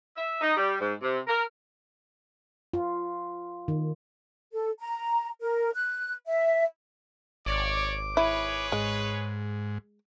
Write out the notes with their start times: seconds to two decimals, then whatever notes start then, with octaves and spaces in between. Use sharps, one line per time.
0.17 E5
0.41 D#4
0.57 G3
0.80 G#2
1.02 C3
1.27 A#4
2.74 F4
3.68 D#3
4.53 A4
4.80 A#5
5.41 A#4
5.74 F#6
6.27 E5
7.46 G#1 C#5 D5 D6
8.17 E4 G#4 B4 C#5
8.72 G#2 G#3